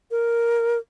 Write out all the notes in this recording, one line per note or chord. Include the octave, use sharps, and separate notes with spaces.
A#4